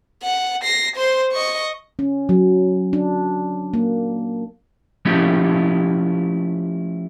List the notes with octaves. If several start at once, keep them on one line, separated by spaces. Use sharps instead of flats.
F#5
A#6 C7
C5 C6
D#5 C#6
C#4
F#3
D4
A#3
F3 A3 C#4 E4 F4 G4